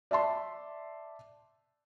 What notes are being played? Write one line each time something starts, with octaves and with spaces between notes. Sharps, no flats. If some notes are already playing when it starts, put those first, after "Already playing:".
D5 E5 A5 C6